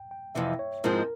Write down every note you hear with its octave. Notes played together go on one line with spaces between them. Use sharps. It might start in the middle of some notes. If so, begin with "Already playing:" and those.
Already playing: G5
G5
F2 C3 E3 E5
C#5
G#2 F3 G#3 C4 A#4